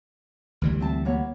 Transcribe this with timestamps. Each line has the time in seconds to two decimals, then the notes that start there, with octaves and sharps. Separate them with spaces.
0.62 D2 E3 G3
0.80 C4 E5 A5
1.05 A#3 B3 C#5